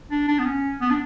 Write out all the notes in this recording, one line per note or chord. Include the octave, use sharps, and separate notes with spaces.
D4
D4
B3
C#4
B3
D4